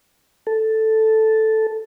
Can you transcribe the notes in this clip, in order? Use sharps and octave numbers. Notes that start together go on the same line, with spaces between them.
A4